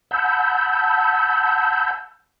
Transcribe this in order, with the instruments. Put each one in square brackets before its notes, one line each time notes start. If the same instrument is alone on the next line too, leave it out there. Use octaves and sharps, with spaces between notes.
[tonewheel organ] F#5 A5 B5 E6 G6